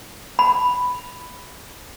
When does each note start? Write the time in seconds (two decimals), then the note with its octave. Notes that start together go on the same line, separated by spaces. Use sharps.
0.39 B5